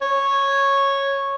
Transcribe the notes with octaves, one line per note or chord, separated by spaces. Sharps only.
C#5